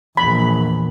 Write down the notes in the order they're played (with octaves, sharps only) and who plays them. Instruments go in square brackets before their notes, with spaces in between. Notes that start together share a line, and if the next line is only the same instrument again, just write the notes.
[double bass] A#1 E2 [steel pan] B5